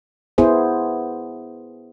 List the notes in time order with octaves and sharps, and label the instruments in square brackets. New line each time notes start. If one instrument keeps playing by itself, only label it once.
[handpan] B3 E4 G#4 C5